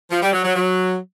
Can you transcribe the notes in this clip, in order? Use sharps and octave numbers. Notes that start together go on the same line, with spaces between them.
F3
G3
F#3
F#3
F#3